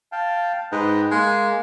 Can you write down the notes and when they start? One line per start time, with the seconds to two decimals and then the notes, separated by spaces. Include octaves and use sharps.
0.12 F5 G5 A5
0.72 G#2 B4 D#5 G5
1.11 G#3 A#3